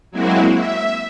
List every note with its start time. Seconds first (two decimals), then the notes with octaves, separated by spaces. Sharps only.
0.11 F#3 G#3 A#3 C4 E4 F#4
0.53 E5